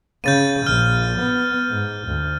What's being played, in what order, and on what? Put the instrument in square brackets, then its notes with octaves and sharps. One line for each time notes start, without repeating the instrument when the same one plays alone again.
[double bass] C#3 [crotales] G6 A6 D#7
[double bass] A#1 [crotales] F6
[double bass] B3
G#2
D2